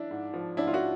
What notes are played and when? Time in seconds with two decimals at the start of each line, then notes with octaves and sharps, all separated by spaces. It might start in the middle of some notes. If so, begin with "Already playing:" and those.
Already playing: D4 E4
0.11 G#2
0.34 F3
0.57 G#2 D4 E4
0.67 F4
0.73 E4 F#4